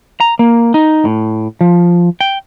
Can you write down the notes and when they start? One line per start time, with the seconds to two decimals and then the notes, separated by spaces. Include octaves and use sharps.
0.20 A#5
0.39 A#3
0.74 D#4
1.05 A2
1.61 F3
2.21 G5